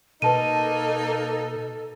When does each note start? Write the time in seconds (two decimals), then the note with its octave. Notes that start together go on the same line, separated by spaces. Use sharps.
0.22 B2 A#3 D#4 A4 B4 A5 D#7